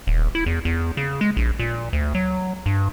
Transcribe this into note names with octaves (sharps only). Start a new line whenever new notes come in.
D#1
E4
E2
E2
C#3
G#3
A#1
A#2
D2
F#3
G2